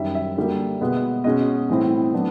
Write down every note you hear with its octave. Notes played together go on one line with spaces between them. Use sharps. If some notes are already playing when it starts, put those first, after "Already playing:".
Already playing: F#2 D#3 G3 E5
E5
D3 G3 A#3
B2 G#3 B3
B2 G#3 C#4 D#5
A2 E3 G3 C4 E4
A2 F#3 B3 D4